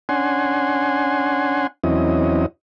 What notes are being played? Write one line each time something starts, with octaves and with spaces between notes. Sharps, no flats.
C#4 D4 F#5 G#5 C6
E2 F#3 C4 C#4 E4 D#5